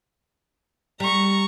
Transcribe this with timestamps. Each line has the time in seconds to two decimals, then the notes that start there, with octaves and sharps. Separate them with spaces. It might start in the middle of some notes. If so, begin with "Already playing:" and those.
1.00 G3 A#5 C#6